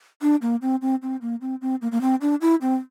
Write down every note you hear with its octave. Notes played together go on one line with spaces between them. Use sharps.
D4
A#3
C4
C4
C4
A#3
C4
C4
A#3
A#3
C4
D4
E4
C4